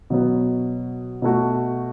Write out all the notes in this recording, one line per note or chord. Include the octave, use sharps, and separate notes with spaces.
B2 F#3 B3
B2 A3 F#4